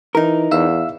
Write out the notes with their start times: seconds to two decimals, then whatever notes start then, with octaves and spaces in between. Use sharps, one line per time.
0.15 E3 D#4 A#4
0.51 E2 E5 F5 E6